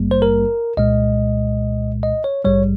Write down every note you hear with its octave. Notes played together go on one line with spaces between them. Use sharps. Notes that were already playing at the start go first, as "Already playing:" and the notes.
Already playing: G#1 G2 G3 A#3
C5
A#4
C2 A#2 G#3 D#5
D#5
C#5
A#1 G#2 G3 C#5